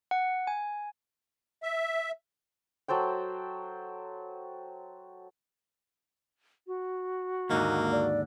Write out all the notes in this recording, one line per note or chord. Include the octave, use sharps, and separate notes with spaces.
F#5
G#5
E5
F#3 A4 C5 G5
F#4
D#2 G#2 D3 A#3 D#5
D5